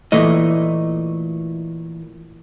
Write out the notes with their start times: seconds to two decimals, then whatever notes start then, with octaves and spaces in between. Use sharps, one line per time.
0.12 A#2 E3 A3 D#5